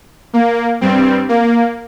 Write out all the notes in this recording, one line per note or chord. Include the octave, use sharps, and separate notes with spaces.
A#3
G2 G3 C4
A#3